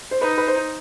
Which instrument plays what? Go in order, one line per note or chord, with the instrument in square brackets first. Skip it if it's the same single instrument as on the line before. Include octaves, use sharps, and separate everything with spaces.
[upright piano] C5
[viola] D#4 [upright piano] B4
[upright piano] B4
C5